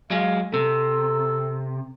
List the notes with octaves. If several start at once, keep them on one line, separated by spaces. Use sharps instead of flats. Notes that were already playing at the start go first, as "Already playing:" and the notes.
F#3 G#3 F5
C3 A4